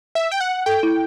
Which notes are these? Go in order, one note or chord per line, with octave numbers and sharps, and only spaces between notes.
E5
G5
F#5
A4 G5
E4